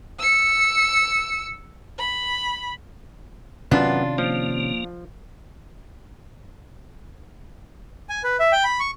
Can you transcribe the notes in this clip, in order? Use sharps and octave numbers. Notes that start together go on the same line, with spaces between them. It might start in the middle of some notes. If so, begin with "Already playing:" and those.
E6 C#7
B5
F#2 C3 D#3 B3 C#4 D4 F4
F3 A#3
G#5
B4
E5
G5
B5
C#6